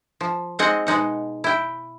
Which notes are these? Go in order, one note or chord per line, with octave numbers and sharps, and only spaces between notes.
F3
G#3 C4 D#4 G#4 D#5 F#5
B2 G#3 D#4 F#5
E4 G5